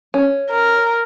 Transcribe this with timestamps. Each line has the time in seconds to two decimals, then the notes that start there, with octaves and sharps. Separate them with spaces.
0.14 C#4
0.50 A#4